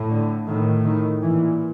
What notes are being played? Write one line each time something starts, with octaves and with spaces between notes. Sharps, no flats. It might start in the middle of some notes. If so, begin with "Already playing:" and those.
Already playing: A2
D3
A2 D#3
D#3
A#2 E3